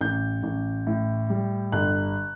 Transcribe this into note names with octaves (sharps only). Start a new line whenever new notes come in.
A1 G6
A1
A2
G3
G1 F#6